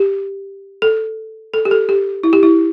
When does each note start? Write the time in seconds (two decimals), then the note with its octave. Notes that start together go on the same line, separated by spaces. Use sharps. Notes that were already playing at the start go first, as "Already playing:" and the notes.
Already playing: G4
0.82 A4
1.54 A4
1.65 G4
1.71 A4
1.89 G4
2.23 E4
2.33 G4
2.43 E4